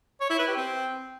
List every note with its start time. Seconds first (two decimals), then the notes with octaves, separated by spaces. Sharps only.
0.20 C#5
0.30 E4
0.39 B4
0.48 G4
0.57 C4